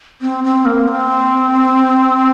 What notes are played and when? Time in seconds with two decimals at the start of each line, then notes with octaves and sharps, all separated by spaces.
0.22 C4
0.44 C4
0.65 A#3
0.88 C4